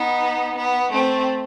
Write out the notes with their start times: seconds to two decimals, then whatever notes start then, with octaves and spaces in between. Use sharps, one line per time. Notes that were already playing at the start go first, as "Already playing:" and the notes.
Already playing: B3 D#4
0.56 B3
0.91 A3 C4